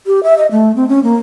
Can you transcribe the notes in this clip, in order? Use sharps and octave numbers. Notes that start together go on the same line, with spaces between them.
G4
E5
D#5
A3
C4
C#4
A#3